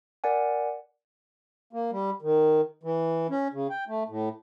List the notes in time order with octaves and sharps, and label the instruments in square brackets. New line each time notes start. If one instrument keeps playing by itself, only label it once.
[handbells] A#4 D5 F#5 G#5
[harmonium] A#3
G3
D#3
E3
C#4
C#3
G5
A3
A2